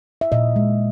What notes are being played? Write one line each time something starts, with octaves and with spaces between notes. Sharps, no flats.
E5
A#2 D#5
G#3